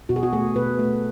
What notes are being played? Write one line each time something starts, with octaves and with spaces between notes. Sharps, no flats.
B2 F#4
G#4
F#4
A3 G#4
B2 B4
A3